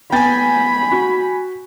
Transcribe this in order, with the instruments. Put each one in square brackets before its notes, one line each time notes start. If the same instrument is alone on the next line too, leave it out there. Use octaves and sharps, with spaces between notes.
[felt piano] B3 A6 [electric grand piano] G5 G#5 [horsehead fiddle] B5
[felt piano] F#4